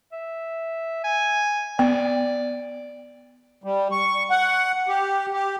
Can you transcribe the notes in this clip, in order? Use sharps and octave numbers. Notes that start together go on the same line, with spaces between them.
E5
G#5
B3 D5
G3
C#6
F#5
G4
G4